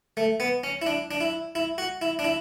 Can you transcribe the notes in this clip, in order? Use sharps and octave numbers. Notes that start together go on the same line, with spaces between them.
A3
B3
C#4
E4
D4
D4
E4
E4
F#4
E4
D4
E4